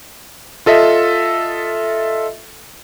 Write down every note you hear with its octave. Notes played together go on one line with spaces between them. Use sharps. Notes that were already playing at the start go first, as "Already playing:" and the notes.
F4 A4 D#5 E5